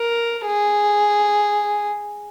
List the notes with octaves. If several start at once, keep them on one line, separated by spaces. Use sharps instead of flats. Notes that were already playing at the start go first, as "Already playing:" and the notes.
Already playing: A#4
G#4